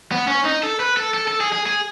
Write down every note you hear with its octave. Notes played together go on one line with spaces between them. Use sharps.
B3
C#4
D#4
A4
B4
A4
A4
A4
G#4
G#4
G#4